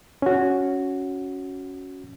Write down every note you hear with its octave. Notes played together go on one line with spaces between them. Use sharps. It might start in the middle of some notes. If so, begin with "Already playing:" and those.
C#4 F#4